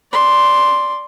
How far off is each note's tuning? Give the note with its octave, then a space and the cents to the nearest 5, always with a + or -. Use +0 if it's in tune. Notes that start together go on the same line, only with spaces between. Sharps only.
D5 +0 C6 +0